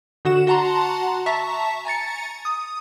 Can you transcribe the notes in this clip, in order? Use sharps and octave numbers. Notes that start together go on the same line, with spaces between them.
D3 F#4 F#5 E7
F#4 F#5 A5 A#5 C6
E5 A5 A#5 C#6 B6
G#5 A#5 A6 C#7
D#6